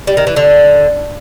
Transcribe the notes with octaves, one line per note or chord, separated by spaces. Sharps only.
G3
D#3
E3
D3